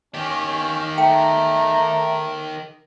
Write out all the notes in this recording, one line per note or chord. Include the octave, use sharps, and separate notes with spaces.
D#3 C#4 G4
A3 G5 A#5